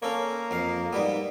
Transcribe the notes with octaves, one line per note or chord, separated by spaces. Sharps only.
A#3 C#4 A4 C#5
F2 F5
G#2 G3 B3